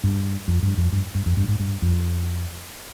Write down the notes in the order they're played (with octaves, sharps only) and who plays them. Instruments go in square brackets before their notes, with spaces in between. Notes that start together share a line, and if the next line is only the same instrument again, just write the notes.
[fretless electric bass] G2
F2
G2
F2
G2
G2
F2
G2
G#2
G2
F2